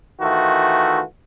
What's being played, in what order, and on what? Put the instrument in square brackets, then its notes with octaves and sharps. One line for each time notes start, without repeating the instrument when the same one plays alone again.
[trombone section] D#3 E3 A3 F4 F#4